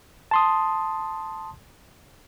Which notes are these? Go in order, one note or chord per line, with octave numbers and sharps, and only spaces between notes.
A5 C6 D#6